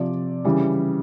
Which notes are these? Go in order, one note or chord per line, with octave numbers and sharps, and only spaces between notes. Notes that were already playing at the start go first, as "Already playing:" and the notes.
Already playing: C3 F3 D5
C#3 E3 G3